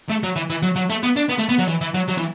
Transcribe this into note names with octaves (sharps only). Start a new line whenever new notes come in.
A3
F#3
E3
E3
F#3
F#3
A3
B3
D4
B3
A3
B3
F#3
E3
E3
F#3
F#3
E3